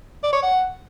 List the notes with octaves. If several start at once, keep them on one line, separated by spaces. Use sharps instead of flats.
D5
C#5
F#5